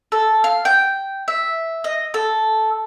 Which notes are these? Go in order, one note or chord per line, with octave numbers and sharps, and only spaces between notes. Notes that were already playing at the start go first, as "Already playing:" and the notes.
A4
F5
G5
E5
D#5
A4